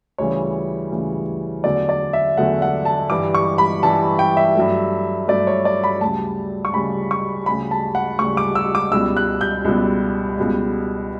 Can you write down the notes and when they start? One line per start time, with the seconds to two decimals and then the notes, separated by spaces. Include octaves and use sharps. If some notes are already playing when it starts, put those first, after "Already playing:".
0.18 D2 C#3 E3 G3 C#5
0.92 D2 C#3 E3 G3
1.64 E2 D3 F#3 A3 D5
1.89 D5
2.13 E5
2.37 E2 D3 F#3 A3 F#5
2.62 F#5
2.85 A5
3.10 G2 E3 G3 D6
3.35 C#6
3.58 B5
3.83 G2 E3 G3 A5
4.19 G5
4.37 E5
4.55 G2 F#3 A3
5.28 G2 F#3 A3 D5
5.47 C#5
5.65 D5
5.84 B5
6.01 D2 C#3 G3 A5
6.65 C#6
6.73 D2 C#3 G3 B5
7.11 C#6
7.46 D2 C#3 G3 B5
7.71 A5
7.95 F#5
8.19 D2 C#3 G3 C#6
8.37 D6
8.55 E6
8.75 D6
8.92 C#2 B2 G3 E6
9.17 F#6
9.41 G6
9.64 C#2 B2 G3
10.37 C#2 B2 G3